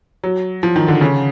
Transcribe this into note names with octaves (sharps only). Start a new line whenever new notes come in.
F#3
F3
D#3
D3
C#3